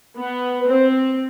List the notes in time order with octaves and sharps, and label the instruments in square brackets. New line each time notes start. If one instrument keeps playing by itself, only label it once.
[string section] B3
[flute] B4
[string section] C4 [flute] C5